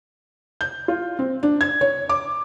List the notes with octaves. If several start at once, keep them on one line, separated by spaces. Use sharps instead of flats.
G6
F4
C4
D4
G#6
C#5
D6